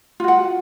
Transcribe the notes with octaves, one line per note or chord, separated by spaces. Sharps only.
F4 F#4 F#5